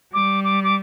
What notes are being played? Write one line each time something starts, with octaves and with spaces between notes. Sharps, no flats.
G3 D6
D6
D6